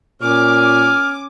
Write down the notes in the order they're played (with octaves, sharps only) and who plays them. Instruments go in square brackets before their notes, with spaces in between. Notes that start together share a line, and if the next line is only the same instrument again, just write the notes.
[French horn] A#2 [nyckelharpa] C#4 G#5 [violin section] D6 [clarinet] F6